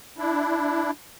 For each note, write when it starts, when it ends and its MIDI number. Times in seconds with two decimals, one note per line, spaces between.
0.18 0.91 62
0.18 0.91 64